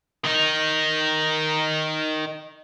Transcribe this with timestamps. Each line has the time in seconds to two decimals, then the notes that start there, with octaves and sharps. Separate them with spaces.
0.24 D#3 D#4